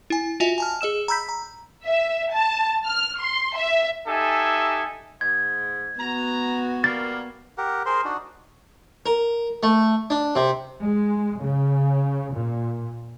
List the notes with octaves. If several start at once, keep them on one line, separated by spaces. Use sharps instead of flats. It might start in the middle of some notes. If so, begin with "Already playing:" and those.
E4 G#5
F4 F#4 D#5 E5 G#5 F7
G#5 A5 F6
G#4 D#5 E6 E7
A#5 B5 E6 G6 B6
A#5
E5
A5
F6
C6
E5
D#4 G4 A4 E5 G#5
G#2 G#6
B3 F#4 A#5
G3 A#3 A6
G4 A#4 F#5
G#4 A#4 C5 C6
D4 D#4 F#4
A#4
A3
D4
C3
G#3
C#3
A#2